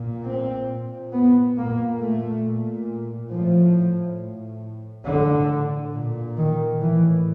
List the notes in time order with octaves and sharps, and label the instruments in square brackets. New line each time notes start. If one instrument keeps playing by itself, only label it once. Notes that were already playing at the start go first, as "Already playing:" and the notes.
Already playing: [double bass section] A#2
C4
A#2
B3
A#2 A#3
A3
A#2
A2 F3
A2
A2 D3
A#2
D#3
A2 E3